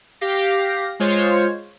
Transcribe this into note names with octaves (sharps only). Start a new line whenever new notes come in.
G4 F5 A#6
G#3 F4 C5 C#5